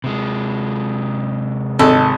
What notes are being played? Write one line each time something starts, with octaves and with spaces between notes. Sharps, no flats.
C3 G#3
G#1 A4